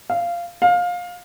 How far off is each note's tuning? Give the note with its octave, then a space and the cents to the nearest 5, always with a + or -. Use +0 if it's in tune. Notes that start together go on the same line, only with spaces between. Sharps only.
F5 -15
F5 +20